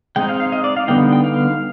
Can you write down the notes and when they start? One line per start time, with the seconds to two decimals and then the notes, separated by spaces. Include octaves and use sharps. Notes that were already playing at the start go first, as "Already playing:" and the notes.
0.16 G#3 C4 D#4 G5
0.29 F5
0.40 F5
0.52 D#5
0.64 D5
0.76 F5
0.88 D3 G3 B3 D#4 G5
1.12 G5
1.24 F5